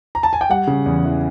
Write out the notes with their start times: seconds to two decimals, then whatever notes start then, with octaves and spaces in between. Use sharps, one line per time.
0.15 A#5
0.23 A5
0.33 G#5
0.41 G5
0.49 G3 F#5
0.67 C#3
0.86 E2
1.05 E3